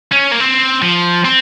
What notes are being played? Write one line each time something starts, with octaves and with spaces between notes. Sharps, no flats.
C#4
A#3
C4
F3
C4